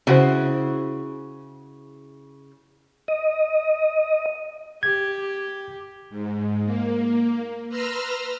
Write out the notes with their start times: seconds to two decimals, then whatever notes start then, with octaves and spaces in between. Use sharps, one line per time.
0.07 C#3 E4 F#4 C5
3.08 D#5
4.83 G4 G#6
6.10 G#2
6.65 A#3
7.69 B4 A#5 C6 E6 F6 A#6